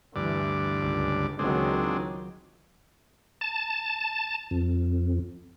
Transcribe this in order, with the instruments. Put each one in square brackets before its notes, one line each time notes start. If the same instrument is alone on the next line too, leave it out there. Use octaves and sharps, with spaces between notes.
[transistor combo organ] D2 G2 D5 [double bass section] E3
[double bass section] C#2
[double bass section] C#2 D#3 F#3 [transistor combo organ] G#3 C4 D4
[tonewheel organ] A5
F2